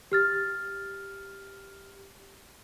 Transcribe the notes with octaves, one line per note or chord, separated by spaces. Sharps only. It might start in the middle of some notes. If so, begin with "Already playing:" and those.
G4 F6 A6